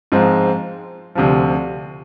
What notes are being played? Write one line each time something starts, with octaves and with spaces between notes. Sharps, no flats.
G#2 F3 G#3 C4 D#4
D2 C3 F3